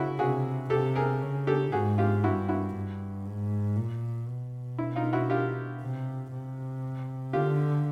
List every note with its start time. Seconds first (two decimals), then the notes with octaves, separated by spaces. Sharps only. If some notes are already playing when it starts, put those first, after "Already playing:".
Already playing: C#3 E4 F#4
0.19 C3 F#4 G#4
0.70 C3 G4 A4
0.95 G#4 A#4
1.21 C#3
1.47 G4 A4
1.72 G#2 F#4 G#4
1.98 F4 G4
2.23 G2 E4 F#4
2.49 E4 F#4
2.75 G2
3.25 G#2
3.76 A#2
4.28 B2
4.78 E4
4.96 D#4 F4
5.13 E4 F#4
5.30 F4 G4
5.81 C3
6.31 C3
7.33 D3 F4 G4